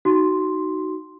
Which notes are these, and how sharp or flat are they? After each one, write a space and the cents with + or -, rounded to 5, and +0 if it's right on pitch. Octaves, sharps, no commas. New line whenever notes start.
D#4 +0 F#4 +15 C6 +0